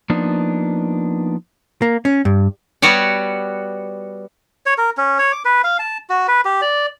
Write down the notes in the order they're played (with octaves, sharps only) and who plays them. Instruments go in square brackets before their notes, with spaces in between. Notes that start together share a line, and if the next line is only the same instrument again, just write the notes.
[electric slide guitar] F3 A#3 B3 D4 D#4
[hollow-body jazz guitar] A#3
C#4
G2
[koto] G3 B3 F#4 C#5 D5
[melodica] C#5
A#4
C#4
C#5
D6
B4
F5
A5
F#4
B4
G4
D5